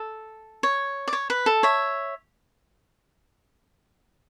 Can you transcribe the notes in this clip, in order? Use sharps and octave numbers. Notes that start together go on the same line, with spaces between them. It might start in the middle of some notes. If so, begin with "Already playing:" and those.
Already playing: A4
C#5
D5
C#5
B4
A4
C#5 E5